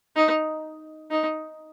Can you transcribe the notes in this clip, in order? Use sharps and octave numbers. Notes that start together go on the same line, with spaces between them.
D#4
D#4